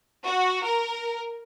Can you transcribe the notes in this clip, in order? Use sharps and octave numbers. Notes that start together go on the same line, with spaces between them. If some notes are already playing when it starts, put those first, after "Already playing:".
F#4
A#4